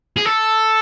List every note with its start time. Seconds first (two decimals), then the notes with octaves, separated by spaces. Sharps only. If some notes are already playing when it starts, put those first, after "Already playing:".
0.17 G#4
0.25 A4